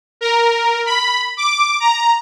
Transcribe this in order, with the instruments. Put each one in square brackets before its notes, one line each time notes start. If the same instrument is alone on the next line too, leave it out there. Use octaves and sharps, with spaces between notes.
[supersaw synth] A#4
B5
D6
A#5